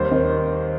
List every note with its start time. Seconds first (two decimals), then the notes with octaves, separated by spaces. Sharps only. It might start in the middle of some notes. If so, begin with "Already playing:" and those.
Already playing: D#2 G3 C5
0.11 D#3